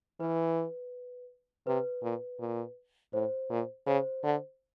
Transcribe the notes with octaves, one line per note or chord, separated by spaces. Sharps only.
E3 B4
C3 B4
A#2
A#2
A2 C5
A#2
C#3 C5
D3